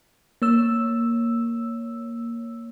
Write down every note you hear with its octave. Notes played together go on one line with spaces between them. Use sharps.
A#3 C#5 E6